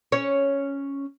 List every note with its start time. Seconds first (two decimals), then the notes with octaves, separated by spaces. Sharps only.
0.12 C#4 C#5